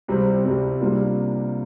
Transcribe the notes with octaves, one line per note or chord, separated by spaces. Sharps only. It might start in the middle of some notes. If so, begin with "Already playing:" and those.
C2 C3 G3 C4
C2 C3 G3 C4
C3 G3 A#3 D4 F4